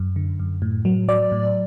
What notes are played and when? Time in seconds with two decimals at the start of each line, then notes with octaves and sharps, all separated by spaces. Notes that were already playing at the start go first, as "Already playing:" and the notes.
Already playing: F#2
0.16 D3
0.40 F#2
0.62 A2
0.85 F#3
1.08 F#3 D5
1.32 A2